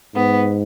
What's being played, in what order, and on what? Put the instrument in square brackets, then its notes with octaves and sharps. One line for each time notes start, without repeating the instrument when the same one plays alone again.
[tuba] G#2 [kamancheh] B3